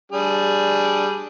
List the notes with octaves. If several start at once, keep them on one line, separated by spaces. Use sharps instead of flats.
G3 D4 G#4